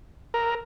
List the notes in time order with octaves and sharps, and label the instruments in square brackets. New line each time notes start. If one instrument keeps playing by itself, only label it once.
[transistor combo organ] A#4